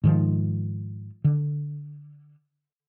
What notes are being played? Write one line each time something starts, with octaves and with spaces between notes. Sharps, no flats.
G#2 D#3 F3
D3